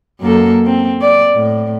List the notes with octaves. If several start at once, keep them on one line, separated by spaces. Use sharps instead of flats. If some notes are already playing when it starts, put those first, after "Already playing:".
F#2 A#3 A4
C4
D5
A2